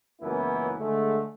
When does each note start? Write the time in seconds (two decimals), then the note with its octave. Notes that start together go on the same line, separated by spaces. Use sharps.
0.22 C#2 F#2 E3 A#3 B3 E4
0.79 D3 G#3 A3